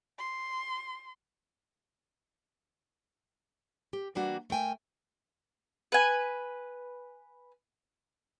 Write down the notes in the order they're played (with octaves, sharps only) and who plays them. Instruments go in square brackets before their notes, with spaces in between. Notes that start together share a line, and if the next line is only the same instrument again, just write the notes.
[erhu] C6
[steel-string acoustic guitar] G4
E3 G3 A#3 D4 F#4
A3 A#4 G5 G#5
[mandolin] B4 G#5